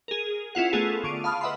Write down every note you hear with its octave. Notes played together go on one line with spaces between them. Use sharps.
G#4 A#4
C#4 E4 F4 F#5
A3 B3 F4 G#4 A4
D3 F4 C#6 D7 D#7
F5 A5 B5 D#6 F6
B4 D#5 E5 F#5 B5 C6